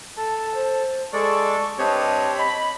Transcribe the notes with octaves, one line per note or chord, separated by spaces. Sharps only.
A4 A5
C5
G#3 A4 D5 C#6
G2 C4 G4 B4 C#5 D#5 A5
D#5 B5